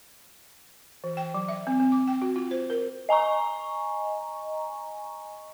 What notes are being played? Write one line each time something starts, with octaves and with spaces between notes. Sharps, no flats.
E3
G5
F#3
E5
C4
C4
D6
G5
F#4
F4
C5
A#4
D#5 G#5 A#5 C#6